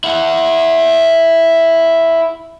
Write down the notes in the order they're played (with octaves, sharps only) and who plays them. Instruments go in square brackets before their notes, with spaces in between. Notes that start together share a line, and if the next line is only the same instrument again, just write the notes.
[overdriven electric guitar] E4 F#5